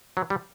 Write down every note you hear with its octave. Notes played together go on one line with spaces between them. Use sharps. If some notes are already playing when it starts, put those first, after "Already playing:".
F#3
G3